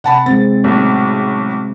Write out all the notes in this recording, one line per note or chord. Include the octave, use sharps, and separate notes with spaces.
C3 F#5 A5 B5
G#3 C4 A6
B1 A2 G4